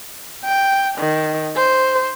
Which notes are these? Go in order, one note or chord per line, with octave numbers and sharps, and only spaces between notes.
G5
D#3
C5